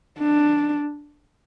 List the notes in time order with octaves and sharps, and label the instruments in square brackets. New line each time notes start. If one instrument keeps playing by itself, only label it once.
[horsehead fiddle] D4